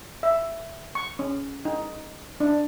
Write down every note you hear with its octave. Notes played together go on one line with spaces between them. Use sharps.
E5
C#6
C#4
D#4
D4